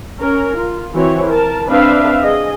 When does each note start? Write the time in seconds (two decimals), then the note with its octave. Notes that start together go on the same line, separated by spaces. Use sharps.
0.18 C#4 A#4
0.57 F4
0.94 E3 C4 E4 F#4 C#5
1.29 A#4 A5
1.67 C4 D4 B4 E5 F5
2.21 G#4 D#5